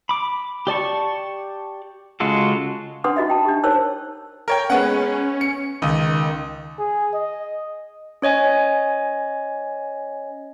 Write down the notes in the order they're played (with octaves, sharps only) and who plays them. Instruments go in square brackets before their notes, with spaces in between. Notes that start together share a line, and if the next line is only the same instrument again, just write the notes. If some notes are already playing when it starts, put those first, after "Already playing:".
[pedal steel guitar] B5 D6
G4 D5 A5 C#6
C#3 G#3 F4 F#4 A4
[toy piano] C#4 D4 B4 F#5 C6 D#6
D#4 F#4 D#5 E5
G5 A5
D4 G4
D#4 A#4 C5 C#5 A5 E6
[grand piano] A#4 C#5 G5
[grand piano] G#3 B3 F#5 [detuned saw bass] C#4
[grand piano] C#7
[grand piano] C#2 [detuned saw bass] D#3
[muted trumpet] G#4
D#5
[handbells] C#4 C#5 D#5 G#5